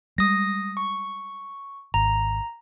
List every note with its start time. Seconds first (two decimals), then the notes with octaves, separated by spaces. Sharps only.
0.18 G3 G#3 D#6 A#6
0.77 C#6
1.94 G#1 A#5